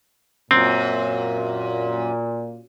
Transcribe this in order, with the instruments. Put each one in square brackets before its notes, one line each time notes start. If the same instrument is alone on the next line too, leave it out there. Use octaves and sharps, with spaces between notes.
[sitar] F#2 [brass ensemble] A#2 [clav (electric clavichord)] C4